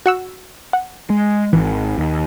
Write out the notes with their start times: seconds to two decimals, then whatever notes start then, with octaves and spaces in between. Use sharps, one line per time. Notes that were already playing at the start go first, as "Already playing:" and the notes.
0.06 F#4 F#5 E6
0.73 F#5
1.10 G#3
1.53 G#1 E3
1.98 D#2